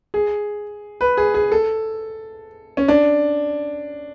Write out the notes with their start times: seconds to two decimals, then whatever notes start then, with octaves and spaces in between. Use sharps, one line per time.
0.14 G#4
1.01 B4
1.17 G#4
1.34 G#4
1.51 A4
2.77 C#4
2.88 D4